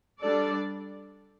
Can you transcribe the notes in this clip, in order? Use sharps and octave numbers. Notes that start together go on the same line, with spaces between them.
G3 D4 A4 D5